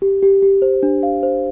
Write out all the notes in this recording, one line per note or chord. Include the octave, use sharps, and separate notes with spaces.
G4
G4
G4
C5
D4
F5
C5